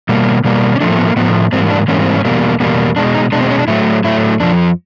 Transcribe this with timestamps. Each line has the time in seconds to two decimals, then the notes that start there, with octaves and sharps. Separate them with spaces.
0.09 B2 G3 A#3
0.44 B2 G3 A#3
0.76 C#4
0.80 A2 F3 A3 D4
0.91 A#3
0.98 B3
1.07 A#3
1.16 A2 F3 A3 B3
1.52 G#2 E3 G3 A#3 C4
1.71 D4
1.88 G#2 E3 G3 A#3 C#4
2.01 C4
2.14 C#4
2.25 E2 B2 G3 A#3
2.60 E2 B2 G3 A#3
2.96 B2 G#3 D4
3.15 D#4
3.32 G#3 D4
3.35 B2
3.41 C4
3.50 C#4
3.59 D4
3.68 A2 F#3 A3 E4
4.04 A2 F#3 A3 E4
4.40 F2 D3 F3 D4